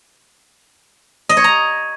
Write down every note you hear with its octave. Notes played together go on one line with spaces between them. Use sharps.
D#5
C#5
A#5